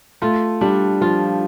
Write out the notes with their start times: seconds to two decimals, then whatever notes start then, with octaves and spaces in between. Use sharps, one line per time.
0.22 A3 F4
0.61 G3 D4
1.01 F3 F4